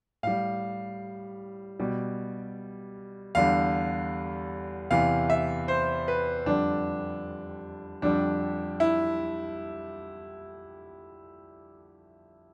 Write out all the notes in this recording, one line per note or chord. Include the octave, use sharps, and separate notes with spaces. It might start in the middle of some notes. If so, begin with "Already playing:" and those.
A2 G3 F5
B2 G3
E2 D3 G3 F5
E2 C3 E3 F5
E5
C5
B4
F2 D3 G3 D4
F2 D3 G3 D4
E4